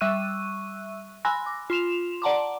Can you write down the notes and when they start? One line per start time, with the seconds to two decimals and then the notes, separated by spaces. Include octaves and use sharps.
0.01 G3 E5 C#6 E6 F#6 D#7
1.25 G#5 B5 C6 E6 F#6 A#6
1.46 D6
1.70 F4 C6 E7 F7
2.22 D5 F#5 A5 A#5 C6 D6